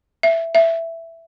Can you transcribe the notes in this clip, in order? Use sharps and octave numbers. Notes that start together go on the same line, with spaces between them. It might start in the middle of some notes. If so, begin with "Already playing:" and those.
E5
E5